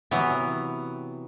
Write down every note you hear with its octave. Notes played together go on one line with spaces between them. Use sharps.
C3 E3 F#3 B3